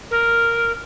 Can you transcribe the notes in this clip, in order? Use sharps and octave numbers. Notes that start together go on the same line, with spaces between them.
A#4